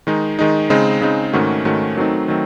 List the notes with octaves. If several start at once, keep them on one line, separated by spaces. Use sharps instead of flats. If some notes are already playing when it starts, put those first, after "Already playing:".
D#3 G#3 D#4
D#3 G#3 D#4
C#3 G#3 C4 D#4
C#3 G#3 C4 D#4
G#2 D#3 A3 C#4 F#4
G#2 D#3 A3 C#4 F#4
D#3 F#3 A3 C4 D#4
D#3 F#3 A3 C4